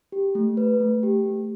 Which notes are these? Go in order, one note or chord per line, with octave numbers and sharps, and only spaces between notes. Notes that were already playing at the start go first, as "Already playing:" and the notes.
G4
A3
B4
A3
G4
A3